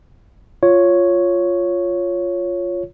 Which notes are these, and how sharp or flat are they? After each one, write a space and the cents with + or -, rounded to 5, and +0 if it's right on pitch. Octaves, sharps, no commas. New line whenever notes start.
F4 +0 C#5 +0